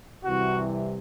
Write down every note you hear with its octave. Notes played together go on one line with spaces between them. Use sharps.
C2 C3 E3 F#4